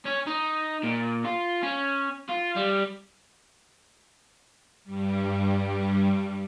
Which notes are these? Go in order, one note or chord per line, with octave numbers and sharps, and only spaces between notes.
C#4
D#4
A#2
F4
C#4
F4
G3
G2 G3